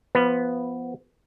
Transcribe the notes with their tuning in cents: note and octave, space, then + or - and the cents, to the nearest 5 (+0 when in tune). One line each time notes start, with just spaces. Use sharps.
F3 -15 B3 +0 B4 +0